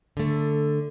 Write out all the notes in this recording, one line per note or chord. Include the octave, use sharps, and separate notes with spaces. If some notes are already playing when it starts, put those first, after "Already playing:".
D3 A3